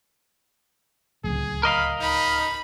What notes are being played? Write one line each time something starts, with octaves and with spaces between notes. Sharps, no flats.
D1 C#2 G#4
A#4 D#5 F5 B5
D#4 B5